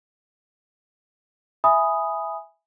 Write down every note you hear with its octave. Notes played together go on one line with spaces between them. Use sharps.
E5 G#5 B5 D#6